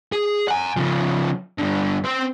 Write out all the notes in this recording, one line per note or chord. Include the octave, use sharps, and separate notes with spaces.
G#4
F#5 G#5
C#3 F3
G2 D3
C4 C5